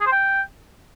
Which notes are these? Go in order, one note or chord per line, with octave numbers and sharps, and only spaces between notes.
G#4
C5
G5